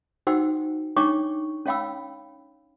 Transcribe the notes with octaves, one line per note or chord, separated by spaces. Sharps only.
D#4 F#4 C5 F#5 G5 E6
D4 D#4 C#5 G5 C#6 D6
C#4 C#5 F5 G5 B5 E6